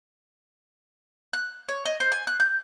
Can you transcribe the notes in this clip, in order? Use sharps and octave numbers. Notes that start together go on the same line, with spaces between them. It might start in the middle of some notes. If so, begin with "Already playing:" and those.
F#6
C#5
D#5
C5
G#5
F#6
G6